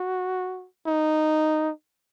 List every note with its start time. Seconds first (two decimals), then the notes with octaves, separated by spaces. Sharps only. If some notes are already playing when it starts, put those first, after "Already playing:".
Already playing: F#4
0.86 D#4